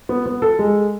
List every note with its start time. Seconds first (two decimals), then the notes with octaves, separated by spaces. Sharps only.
0.09 B3
0.26 B3
0.42 A4
0.59 G#3